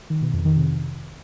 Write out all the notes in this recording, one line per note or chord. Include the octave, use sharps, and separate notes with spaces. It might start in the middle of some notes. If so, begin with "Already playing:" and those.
D#3
B2
F2
D#3
C3